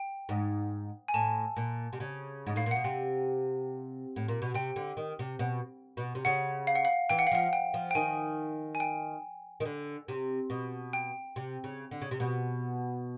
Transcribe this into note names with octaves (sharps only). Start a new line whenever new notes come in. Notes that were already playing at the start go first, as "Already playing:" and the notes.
Already playing: G5
G#2
G#5
A2 A5
A#2
C3
C#3
G#2
A2 F5
A#2
B2 F#5
C3 G5
A2
A#2
B2
C3 G5
D3
D#3
C3
B2
B2
C3
C#3 F#5
F5
F#5
F5
E3 G5
F#5
F5
F3 F#5
G5
F3
G5
D#3 G#5
G#5
G5
D#3
D3
C3
B2
G5
C3
C#3
D3
C#3
C3
B2